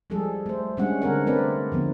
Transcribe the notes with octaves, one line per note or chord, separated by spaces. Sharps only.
F3 G3 G#3 G#4 A4
A3 C5
G3 G#3 C#4 D4 F#5
D3 G#3 C4 A#4 C#5 F#5
A3 C4 A#4 B4 D5
D3 F3 B3